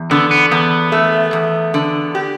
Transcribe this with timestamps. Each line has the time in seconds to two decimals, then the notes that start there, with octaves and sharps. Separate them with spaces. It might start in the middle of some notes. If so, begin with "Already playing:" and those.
Already playing: E2
0.11 D3 B3
0.31 B3
0.51 E2 B3
0.92 A3
1.33 E2
1.74 D3
2.15 G4